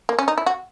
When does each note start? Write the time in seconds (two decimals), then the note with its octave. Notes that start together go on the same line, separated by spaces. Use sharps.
0.09 A#3
0.19 C#4
0.28 D#4
0.38 E4
0.46 F#4